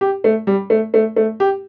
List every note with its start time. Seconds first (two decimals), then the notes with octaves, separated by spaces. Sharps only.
0.01 G4
0.24 A3
0.47 G3
0.70 A3
0.94 A3
1.16 A3
1.40 G4